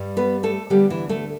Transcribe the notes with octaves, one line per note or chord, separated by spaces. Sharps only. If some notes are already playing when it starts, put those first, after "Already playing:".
Already playing: G2 G3
B3 B4
A3 A4
D2 D3 G3 B3 G4
E3 E4
A3 A4